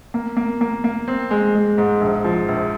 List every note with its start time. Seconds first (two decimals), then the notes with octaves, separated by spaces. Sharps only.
0.14 A#3
0.37 A#3
0.61 A#3
0.84 A#3
1.08 C4
1.31 G#3
1.55 G#3
1.78 G#2
2.01 A#1
2.24 F3
2.48 A#1